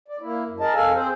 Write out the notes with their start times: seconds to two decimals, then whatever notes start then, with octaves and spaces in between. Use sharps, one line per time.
0.08 D5
0.21 A#3 E4
0.47 F#2
0.60 G#4 A#4 D#5 A5
0.74 F2 A4 F5 G#5
0.94 C4 G#4 C5